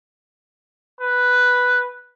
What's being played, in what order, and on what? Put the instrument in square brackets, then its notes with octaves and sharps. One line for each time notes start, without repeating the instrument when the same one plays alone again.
[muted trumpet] B4